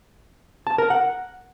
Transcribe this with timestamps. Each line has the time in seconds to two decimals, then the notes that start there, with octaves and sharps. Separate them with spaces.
0.67 A5
0.78 A#4
0.90 F#5